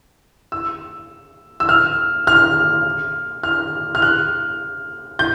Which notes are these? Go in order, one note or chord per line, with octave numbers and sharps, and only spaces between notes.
E6
E6
F6
F6
F6
F6
F#6
G6